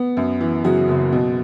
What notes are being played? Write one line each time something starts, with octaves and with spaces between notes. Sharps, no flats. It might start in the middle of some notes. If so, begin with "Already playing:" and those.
Already playing: B3
F#2
E3
C#3 F#3 F#4
F#1
B2